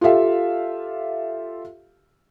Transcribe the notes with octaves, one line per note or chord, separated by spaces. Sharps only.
F4 G4 A4 E5 F5